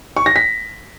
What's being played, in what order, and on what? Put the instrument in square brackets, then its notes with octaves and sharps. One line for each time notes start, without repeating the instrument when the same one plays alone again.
[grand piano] C#6
A#6
B6